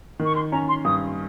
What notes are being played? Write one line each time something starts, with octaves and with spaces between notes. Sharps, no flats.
D#3
C#6
C6
C#4 A#5
C6
G2 D#6